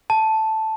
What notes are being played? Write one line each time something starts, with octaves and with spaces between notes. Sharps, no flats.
A5